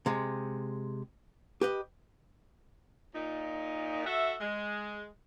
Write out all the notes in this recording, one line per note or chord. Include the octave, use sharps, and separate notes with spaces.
C3 G#3
G4 B4 D#5
A#2 D#4
F#4 A4 E5
G#3